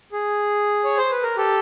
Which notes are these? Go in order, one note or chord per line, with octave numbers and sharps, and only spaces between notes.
G#4
C#5
C5
B4
A#4
G4 A4